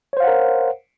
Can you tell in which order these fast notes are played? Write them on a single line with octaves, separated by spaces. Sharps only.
C#5 C5 F5 F#5 A#4